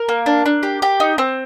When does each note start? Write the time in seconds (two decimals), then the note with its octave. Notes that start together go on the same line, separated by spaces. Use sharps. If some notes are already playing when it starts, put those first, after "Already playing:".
Already playing: A#4
0.09 A#3
0.26 D4
0.46 D4
0.63 G4
0.82 G4
1.00 D#4
1.18 C4